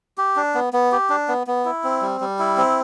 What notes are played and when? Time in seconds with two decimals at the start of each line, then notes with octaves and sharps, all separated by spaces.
0.18 G4
0.36 D4
0.55 B3
0.73 B3
0.92 G4
1.10 D4
1.28 B3
1.47 B3
1.65 E4
1.84 C4
2.02 G3
2.21 G3
2.39 E4
2.57 C4